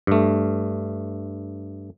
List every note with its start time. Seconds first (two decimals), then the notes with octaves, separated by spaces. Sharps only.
0.07 G2 A3